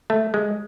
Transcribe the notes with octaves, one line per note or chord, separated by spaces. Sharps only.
A3
G#3